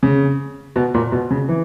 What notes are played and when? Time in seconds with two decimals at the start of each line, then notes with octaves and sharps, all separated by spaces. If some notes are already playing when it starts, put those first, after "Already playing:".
0.03 C#3
0.76 B2
0.94 A#2
1.12 B2
1.30 C#3
1.49 E3